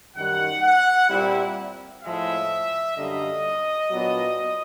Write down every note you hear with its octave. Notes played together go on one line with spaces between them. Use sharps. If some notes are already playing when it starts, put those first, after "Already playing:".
F#2 D#3 G3 F#5
F#5
A#2 G3 C4 E4
A2 F3 G#3 E5
F#2 D3 G3 A#3 D#5
A#2 F#3 B3 D4